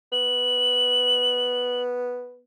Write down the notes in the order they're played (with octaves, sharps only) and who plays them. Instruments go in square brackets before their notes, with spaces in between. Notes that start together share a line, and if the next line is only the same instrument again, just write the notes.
[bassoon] B3 [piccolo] F#7